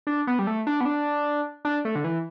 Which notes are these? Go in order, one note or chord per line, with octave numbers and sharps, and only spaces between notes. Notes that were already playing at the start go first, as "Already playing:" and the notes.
D4
B3
G3
A3
D4
B3
D4
D4
A3
D3
E3